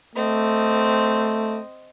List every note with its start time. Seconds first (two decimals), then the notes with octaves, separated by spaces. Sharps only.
0.15 A3 C4 D#5